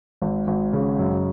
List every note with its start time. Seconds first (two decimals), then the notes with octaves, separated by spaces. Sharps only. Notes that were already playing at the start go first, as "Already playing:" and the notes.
0.22 G#1
0.47 G#1
0.73 C#3
0.99 F#2